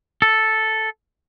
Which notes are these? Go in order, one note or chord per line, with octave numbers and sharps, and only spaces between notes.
A4